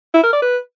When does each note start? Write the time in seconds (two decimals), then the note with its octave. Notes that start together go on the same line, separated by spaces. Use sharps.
0.14 E4
0.24 A#4
0.33 D5
0.42 B4